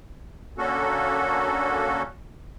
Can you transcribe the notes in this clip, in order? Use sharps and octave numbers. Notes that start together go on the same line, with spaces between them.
D3 A#3 C#4 F#4 A4